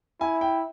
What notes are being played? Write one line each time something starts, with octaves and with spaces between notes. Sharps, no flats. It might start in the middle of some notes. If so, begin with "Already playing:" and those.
E4 G#5
G5